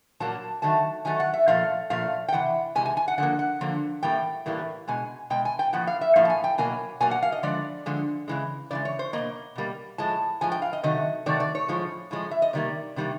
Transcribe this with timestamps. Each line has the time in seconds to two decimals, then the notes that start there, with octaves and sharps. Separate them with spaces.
0.20 A#2 F#3 A#3 A5
0.62 D#3 F#3 A3 A5
1.05 D#3 F#3 A3 G#5
1.20 F#5
1.34 E5
1.48 A#2 F3 A3 F5
1.90 A#2 F3 A3 F5
2.28 G5
2.32 C3 E3 F#5
2.75 C3 E3 G#3 G#5
2.85 G#5
2.97 G#5
3.08 F#5
3.18 D3 F3 A#3 F#5
3.39 F#5
3.61 D3 F3 A#3
4.03 A2 E3 G3 A#3 G5
4.46 A2 E3 G3 A#3
4.87 B2 G#3 G#5
5.30 B2 G#3 G5
5.45 G#5
5.59 G5
5.73 A2 F3 A#3 F#5
5.87 F5
6.01 E5
6.16 A2 F3 A#3 F5
6.25 A5
6.30 G#5
6.44 G5
6.58 B2 F#3 A#3 G#5
7.00 B2 F#3 A#3 G#5
7.11 F#5
7.22 F5
7.32 D#5
7.43 D3 F3 G#3 D5
7.86 D3 F3 G#3
8.28 C#3 E3 G#3
8.71 C#3 E3 G#3 D5
8.85 C#5
8.99 C5
9.13 G3 A#3 D#5
9.18 B2
9.55 B2 G3 A#3
9.98 A2 F3 G#3 A5
10.41 A2 F3 G#3 G#5
10.52 G5
10.62 F5
10.73 D#5
10.83 C3 D#3 F#3 A3 D#5
11.26 C3 D#3 F#3 A3 D5
11.40 D5
11.55 C#5
11.68 A2 F3 G#3
12.11 A2 F3 G#3
12.31 E5
12.42 D#5
12.53 C3 D#3 G3 A#3 D5
12.96 C3 D#3 G3 A#3